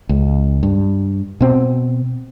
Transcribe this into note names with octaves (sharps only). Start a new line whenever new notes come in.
C#2
G2
B2 C4